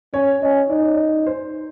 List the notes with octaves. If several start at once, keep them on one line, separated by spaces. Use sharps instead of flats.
C#4 C#5
C#4 D#5
D#4 D5
C#5
D5
C5